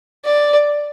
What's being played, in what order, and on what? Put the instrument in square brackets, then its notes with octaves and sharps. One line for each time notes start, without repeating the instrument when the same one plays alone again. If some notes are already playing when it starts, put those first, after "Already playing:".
[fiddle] D5